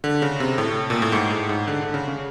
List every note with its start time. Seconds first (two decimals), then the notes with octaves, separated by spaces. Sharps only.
0.04 D3
0.22 C#3
0.40 C3
0.58 A2
0.90 A#2
1.02 A2
1.12 G#2
1.30 A2
1.49 G#2
1.68 D3
1.81 D3
1.94 C#3
2.08 C#3